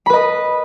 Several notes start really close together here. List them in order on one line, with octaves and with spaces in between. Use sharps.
B5 B4 D#5